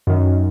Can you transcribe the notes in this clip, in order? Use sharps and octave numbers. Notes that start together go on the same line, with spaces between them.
F#2 D#3